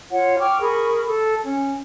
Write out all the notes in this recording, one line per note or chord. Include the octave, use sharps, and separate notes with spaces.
F4 C#5 F#5
G5 C#6 D6 F6
G#4 A#4 B5 C#6
A4
C#4